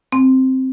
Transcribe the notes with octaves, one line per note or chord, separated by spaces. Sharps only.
C4